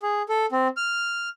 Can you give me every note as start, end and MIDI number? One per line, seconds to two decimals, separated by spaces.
0.03 0.22 68
0.29 0.46 69
0.52 0.68 60
0.77 1.29 89